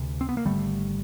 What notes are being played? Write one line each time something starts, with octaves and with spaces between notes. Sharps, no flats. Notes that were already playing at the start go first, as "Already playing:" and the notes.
Already playing: D2 C3
C4
B3
A#3
G#1 G2 D3 G3 A3